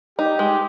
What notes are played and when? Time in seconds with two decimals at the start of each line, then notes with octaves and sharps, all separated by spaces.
0.19 D#4 G4
0.39 G#3